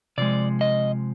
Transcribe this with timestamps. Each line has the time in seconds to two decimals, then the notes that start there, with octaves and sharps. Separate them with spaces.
0.18 C3 F3 G#3 D5
0.61 D#5